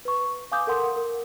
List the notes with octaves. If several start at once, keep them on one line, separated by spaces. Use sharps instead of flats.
B4 C#6
F5 G#5 D6 D#6 G6
A4 A#4 F#5 C6 D#6
A#4